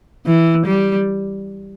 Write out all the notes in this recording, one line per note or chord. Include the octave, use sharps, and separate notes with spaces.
E3
G3